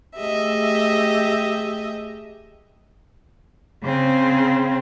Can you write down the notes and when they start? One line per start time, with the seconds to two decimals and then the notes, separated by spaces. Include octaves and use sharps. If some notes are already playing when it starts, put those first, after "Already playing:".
0.17 A3 G4 G#4 D#5 E5
3.82 C#3 C4